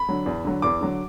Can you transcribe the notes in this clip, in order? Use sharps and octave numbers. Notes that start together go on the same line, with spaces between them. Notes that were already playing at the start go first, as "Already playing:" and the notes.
Already playing: B5
D3 F#3
E2
D3 F#3
E2 D6
D3 F#3